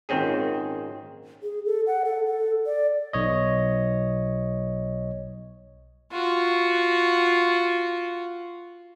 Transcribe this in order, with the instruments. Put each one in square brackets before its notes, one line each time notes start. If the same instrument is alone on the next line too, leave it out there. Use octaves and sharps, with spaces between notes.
[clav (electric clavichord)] G#1 A#2 D#3 C4 C#4 G#4
[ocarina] G#4
A4
F#5
A4
A4
D5
[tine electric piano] B1 C#5 D#5
[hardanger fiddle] F4 F#4